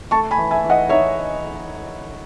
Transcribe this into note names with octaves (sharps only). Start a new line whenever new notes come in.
A3 A5 C#6
G#5 B5
E3
E5 G#5
E3
D#5 F#5
D#4 C#5 E5